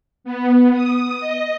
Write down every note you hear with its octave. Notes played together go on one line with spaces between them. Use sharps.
B3
D#6
D#5